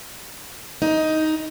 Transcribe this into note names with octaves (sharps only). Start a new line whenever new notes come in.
D#4